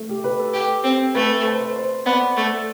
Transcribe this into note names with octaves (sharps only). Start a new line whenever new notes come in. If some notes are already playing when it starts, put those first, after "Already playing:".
Already playing: A3
G4
B4
A4
G4
C4
A3 B4
C5
C5
C5
B3 D5
A3